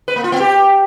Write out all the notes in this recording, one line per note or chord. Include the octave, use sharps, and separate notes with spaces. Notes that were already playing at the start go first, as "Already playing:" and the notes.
B4
A#3
F4
B3
G4